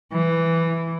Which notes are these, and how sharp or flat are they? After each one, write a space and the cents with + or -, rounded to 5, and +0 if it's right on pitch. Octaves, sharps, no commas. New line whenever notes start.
E3 +5